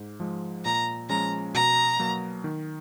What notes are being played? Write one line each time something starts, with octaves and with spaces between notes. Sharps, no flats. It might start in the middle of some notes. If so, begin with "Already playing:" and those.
Already playing: G#2
F3 G#3
A#2 A#5
F3 G#3 C#4 A#5
B2 A#5
F#3 A#3
D#3